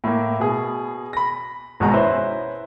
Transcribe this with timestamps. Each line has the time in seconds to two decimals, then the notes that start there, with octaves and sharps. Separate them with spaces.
0.04 A2 A#3
0.40 B2 G#4
1.13 B5 A#6
1.80 G#1 B2 G#3 F#4 A#5
1.94 C#4 E4 B4 C5 E5